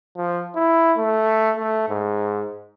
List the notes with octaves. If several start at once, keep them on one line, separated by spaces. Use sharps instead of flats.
F3
E4
A3
A3
G#2